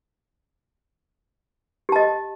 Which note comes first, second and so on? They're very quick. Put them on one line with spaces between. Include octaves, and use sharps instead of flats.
G4 A5 D#5